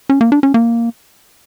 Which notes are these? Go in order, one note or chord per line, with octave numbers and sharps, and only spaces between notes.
C#4
A#3
D4
C#4
A#3